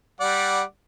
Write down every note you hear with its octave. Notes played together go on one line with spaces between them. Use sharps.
G3 D5 F#5